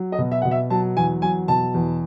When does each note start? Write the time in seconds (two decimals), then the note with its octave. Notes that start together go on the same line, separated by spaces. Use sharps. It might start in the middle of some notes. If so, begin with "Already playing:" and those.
Already playing: F#3
0.12 D#5
0.19 B2
0.32 E5
0.42 B2 F#5
0.51 E5
0.70 F#3 A5
0.97 E2 G#5
1.22 F#3 G#5
1.48 B2 A5
1.74 E2